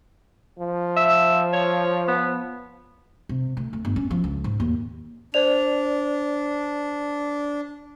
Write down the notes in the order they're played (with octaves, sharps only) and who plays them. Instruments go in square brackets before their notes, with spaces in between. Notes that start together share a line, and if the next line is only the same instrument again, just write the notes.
[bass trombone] F3
[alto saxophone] E5
C#5
B3
[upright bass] C3
D2
D2
G1
C#4
F3
C#2
G#2
D#2
[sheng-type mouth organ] D4 [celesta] C5 D5 F7